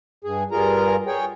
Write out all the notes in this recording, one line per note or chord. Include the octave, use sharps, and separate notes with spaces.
G2 G#4
G2 G3 F4 G#4 A#4 A#5
G#4 C#5 G5